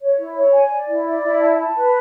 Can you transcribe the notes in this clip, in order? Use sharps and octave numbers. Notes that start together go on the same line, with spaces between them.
C#5
E4
C#5
G#5
D5
E4
D5
E4
A5
A5
B4